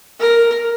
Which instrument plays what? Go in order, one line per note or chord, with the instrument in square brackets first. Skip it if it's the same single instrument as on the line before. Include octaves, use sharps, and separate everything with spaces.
[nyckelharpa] A#4